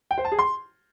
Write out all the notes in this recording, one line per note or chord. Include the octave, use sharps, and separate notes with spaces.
G5
C5
A5
G#4
C6